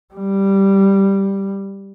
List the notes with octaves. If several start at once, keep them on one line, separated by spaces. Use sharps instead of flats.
G3